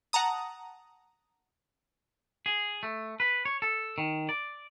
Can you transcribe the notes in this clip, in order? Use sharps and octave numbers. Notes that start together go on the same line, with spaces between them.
F#5 A5 A#5 D#6
G#4
A3
B4
C#5
A4
D#3
D5